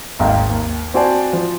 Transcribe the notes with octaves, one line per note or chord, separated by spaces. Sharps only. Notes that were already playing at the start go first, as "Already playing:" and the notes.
G#1 D#2 G#2 A#3 F5 G5
D#2
C4 F#4 C5 D5 G#5 A5
F3